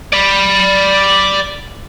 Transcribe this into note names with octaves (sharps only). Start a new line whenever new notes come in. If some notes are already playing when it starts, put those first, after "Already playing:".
D5 B5